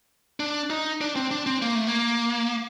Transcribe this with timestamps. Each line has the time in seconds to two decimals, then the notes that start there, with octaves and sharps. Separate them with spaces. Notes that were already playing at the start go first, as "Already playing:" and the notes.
0.40 D4
0.70 D#4
1.01 D4
1.16 C4
1.31 D4
1.46 C4
1.62 A#3
1.75 A3
1.87 A#3